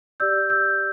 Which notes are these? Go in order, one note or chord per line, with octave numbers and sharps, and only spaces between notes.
G4 D5 E6 G6
E6 G6